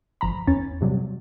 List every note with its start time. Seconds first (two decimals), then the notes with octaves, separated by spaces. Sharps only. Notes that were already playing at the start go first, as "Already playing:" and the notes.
0.21 G1 F3 A#5 B5
0.47 E2 C#4 A6
0.81 G2 C3 F#3 G3